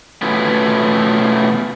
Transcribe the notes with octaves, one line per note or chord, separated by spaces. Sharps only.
B2 A3 B3 C#4 E4 F4